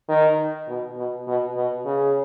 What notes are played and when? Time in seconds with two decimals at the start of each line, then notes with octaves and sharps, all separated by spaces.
0.09 D#3
0.68 B2
0.97 B2
1.27 B2
1.57 B2
1.85 C#3